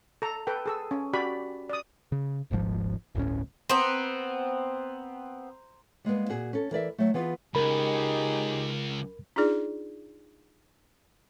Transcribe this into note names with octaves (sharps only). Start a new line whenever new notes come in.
A4 A#5
A4 B4 G5
G#4 A4 E6
C#4
F#4 G4 D5 B5
D5 D#6
C#3
D#1 G#1 G#2 F3
G1 D2 A2 C#4
B3 C4 C5 A#5
G3 G#3 A#3 B3
A#2 F#4 G#4
C#4 A4
E3 A#4 D5 E5
F#3 A3
E3 B3 F4 G#4
C#2 D#4 G4 G#4 A#4 B5
D4 D#4 F4 G#4 D5